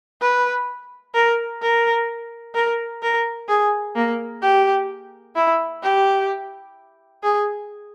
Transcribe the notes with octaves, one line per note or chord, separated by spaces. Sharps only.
B4
A#4
A#4
A#4
A#4
G#4
A#3
G4
E4
G4
G#4